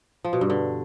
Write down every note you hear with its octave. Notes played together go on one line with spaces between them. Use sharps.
F3
B2
G2
D3